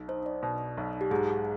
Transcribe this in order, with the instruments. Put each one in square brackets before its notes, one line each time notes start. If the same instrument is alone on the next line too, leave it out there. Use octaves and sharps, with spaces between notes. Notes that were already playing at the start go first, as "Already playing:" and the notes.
Already playing: [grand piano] B1
[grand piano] D#4 [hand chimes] C5
[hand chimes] D5
[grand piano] B2
B1
[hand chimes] G4
[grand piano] G#2 [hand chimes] G#4